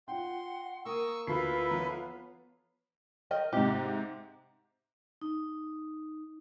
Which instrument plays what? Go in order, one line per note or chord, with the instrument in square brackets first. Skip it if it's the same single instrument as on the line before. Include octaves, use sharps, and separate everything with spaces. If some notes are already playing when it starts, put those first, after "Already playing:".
[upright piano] F4 G5 [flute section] F#5 [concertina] C6
[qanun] A#3 A#4 [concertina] C#6 E6 [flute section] D#6
[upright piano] D2 C7 [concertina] E4 A4 E5 [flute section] F4 B4
[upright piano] F3 A#5 [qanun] B3 C#5
[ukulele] A#4 D#5 G5
[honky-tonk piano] G#2 C3 [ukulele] G4
[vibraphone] D#4